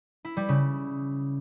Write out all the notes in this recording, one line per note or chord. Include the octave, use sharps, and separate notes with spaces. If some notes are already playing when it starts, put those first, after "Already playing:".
E4
G3
C#3